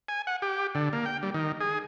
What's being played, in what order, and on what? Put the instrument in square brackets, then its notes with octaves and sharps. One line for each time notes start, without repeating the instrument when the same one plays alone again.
[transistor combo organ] G#5
F#5
G4
D3
A#3
G5
G3
D#3
G#4